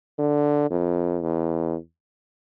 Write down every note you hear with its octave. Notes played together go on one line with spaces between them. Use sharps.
D3
F2
E2